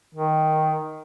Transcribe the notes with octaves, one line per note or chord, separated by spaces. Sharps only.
D#3